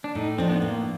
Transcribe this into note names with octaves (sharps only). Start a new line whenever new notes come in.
D4
A2 D#4
F3 A3 C4 D4
B3
A2 A#3